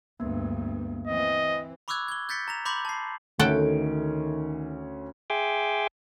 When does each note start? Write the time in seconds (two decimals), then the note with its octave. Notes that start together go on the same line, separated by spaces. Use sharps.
0.20 D2 G2 A#3 B3
1.07 E3 C4 D#5
1.88 B5 C#6 D6 E6 F#6 G#6
2.08 G#6 G7
2.29 G6 A6 B6 C#7 G7
2.48 A#5 A#6 F7
2.65 B5 C6 D6 G6 A#6 F#7
2.85 A5 C7
3.39 D2 D#3 A3 C#4 A4 F#5 G5 D7
5.30 G#4 E5 G5 G#5 C6 D6